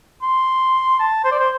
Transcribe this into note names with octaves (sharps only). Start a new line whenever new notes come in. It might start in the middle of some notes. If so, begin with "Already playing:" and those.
C6
A5
C5
D5
C5